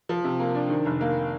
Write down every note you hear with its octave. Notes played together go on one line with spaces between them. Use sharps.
F3
C3
A#3
D4
D#3
F1
A#3